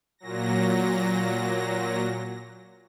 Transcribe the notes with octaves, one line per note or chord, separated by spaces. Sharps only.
A#2 F#3 A#6